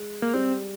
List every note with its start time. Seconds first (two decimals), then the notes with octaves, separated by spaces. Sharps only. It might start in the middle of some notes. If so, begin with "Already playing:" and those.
Already playing: G#3
0.22 A#3
0.34 G3 C4